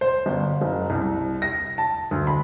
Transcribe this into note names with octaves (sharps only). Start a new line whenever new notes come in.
C5
G1
F#1
C2
A#6
A5
D2
B5